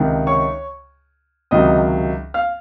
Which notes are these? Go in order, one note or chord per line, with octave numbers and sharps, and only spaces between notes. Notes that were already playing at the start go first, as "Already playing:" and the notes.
Already playing: C#2 C3 D#3
C#5 C#6
C#2 C3 D#3 F#3 D#5 D#6
F5 F6